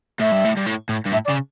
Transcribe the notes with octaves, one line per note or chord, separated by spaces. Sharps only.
A2 E5
G2
A2
G2
A2
A2
G2
A2 E5
D5
C#3